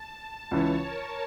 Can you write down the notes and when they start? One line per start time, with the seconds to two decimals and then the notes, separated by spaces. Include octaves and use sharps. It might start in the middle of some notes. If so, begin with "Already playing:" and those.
Already playing: A5
0.51 C#2 C#3 E3 C#5
0.83 A#4